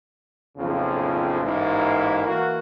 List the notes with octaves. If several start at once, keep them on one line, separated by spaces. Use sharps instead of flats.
B1 F2 A2 C#3 F3
A1 G#2 A#3 E4
E3 A#3 F#4